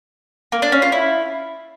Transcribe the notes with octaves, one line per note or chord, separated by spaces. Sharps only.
A#3
D4
C#4
F4
E4